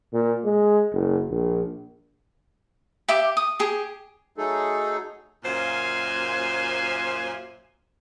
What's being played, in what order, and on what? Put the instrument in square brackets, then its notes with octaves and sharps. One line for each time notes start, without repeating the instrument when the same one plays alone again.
[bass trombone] A#2
G#3
F#1
A#1
[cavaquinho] G4 E5 D6
D#6
G4 G#4
[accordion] F#3 A3 D#4 G#4 A4
[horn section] F#2 A#2 C5 F5 G#5